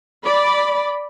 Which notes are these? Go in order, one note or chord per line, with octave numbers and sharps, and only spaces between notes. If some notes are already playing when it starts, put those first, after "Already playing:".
D5 B5